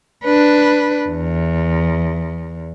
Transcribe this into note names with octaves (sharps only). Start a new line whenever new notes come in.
D4 B4
E2